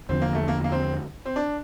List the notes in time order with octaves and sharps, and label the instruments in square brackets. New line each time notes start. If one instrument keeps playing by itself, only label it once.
[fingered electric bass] E2 D3 F3 [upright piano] C4
[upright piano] A#3
A3
A#3
A#3
C4
C4
D4